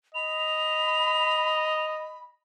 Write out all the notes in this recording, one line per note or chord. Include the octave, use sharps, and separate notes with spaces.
D#5 B5 F7